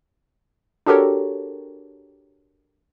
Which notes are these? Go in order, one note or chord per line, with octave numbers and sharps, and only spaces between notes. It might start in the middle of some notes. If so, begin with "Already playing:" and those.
D4 F#4 G4 A4 A#4 C#5